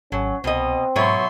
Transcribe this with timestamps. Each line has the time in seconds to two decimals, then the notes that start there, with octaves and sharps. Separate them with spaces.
0.12 G#1 F#3 C#4
0.44 C2 B2 C4 D#5
0.96 G#2 B2 F#3 C#5 E5 B5 C6